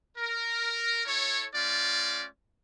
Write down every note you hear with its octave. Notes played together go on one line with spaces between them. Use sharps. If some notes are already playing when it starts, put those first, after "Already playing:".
A#4
E4 A4 C#5
A3 C#4 F4 D5